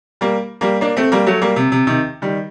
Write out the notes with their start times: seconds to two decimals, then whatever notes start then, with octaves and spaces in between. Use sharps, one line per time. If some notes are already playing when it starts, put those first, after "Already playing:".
0.21 G3 A#3
0.61 G3 A#3
0.81 A#3 D4
0.97 A3 C4
1.12 G3 A#3
1.26 F#3 A3
1.41 G3 A#3
1.56 C3
1.72 C3
1.87 C3 D#3
2.22 D#3 G3